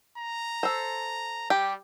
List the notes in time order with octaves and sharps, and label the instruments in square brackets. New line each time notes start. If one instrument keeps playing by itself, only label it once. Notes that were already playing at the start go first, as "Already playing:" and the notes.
[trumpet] A#5
[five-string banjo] A4 C5
[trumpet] G3 [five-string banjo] G4